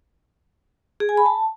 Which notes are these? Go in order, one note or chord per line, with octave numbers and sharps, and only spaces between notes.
G#4
G#5
B5
A5